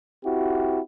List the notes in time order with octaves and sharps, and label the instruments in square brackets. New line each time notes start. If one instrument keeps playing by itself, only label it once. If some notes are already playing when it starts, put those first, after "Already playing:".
[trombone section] C4 E4 F#4 G4